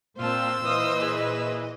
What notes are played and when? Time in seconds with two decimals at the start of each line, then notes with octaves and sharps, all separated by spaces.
0.18 A#2 C4 F4 C5 A5 E6
0.64 A#2 E3 D#5 F5 D#6
0.97 G#4 B4